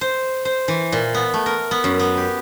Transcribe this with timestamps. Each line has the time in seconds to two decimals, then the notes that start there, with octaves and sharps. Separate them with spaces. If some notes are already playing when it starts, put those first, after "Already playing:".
0.01 C5
0.45 C5
0.68 E3
0.92 A#2
1.14 B3
1.34 A3
1.46 A#4
1.71 B3
1.84 F#2
1.99 B3
2.17 G4